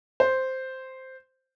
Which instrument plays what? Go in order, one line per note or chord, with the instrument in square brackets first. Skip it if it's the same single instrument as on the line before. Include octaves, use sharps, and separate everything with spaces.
[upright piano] C5